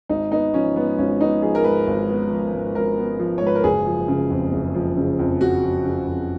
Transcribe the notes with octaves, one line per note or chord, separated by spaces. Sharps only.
G#1 D#4
B3 D#4
F3 C#4
G#2 B3
G#1 C#4
B3 D#4
F3 G#4
A#4
G#2 B4
G#1
B3
F3
G#2
G#1 A#4
B3
F3
G#2 C#5
B4
A#4
F#1 G#4
F3
C#3
F2
F#1
F3
C#3
F2
F#1 F#4
F3
C#3
F2